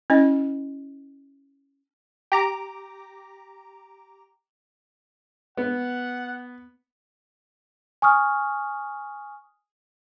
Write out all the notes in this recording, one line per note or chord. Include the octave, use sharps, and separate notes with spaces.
C#4 E4 D#5
G4 A#5 D6
B3 F#5
G#5 C#6 D#6 F6